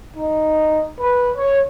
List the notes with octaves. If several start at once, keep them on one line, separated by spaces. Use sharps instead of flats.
D#4
B4
C#5